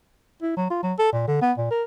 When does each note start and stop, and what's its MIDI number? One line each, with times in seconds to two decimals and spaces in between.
0.42 0.52 64
0.57 0.67 54
0.70 0.83 65
0.83 0.93 54
0.99 1.12 69
1.13 1.23 46
1.27 1.38 50
1.42 1.53 59
1.58 1.67 46
1.71 1.84 70